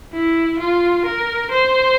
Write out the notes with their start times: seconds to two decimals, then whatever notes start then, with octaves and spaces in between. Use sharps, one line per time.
0.13 E4
0.59 F4
1.05 A#4
1.51 C5